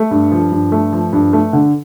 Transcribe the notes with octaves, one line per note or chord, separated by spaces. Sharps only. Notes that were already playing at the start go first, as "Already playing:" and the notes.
Already playing: A3
G2
F3
G2
A3
F3
G2
A3
D3